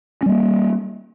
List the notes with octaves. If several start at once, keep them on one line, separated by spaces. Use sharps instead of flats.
G3 A#3 C#4